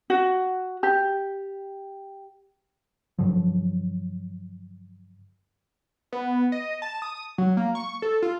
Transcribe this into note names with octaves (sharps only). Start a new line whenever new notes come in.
F#4
G4
G2 D3 F3 F#3
B3
D#5
A5
D#6
F#3
A#3
C#6
A4
F4